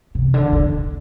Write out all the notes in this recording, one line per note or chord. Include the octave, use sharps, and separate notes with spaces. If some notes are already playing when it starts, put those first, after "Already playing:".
C3
D3
D3